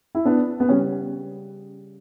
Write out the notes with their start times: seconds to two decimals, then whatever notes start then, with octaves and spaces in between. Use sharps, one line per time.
0.15 E4
0.25 B3 D4
0.60 B3
0.69 C#3 G3 C#4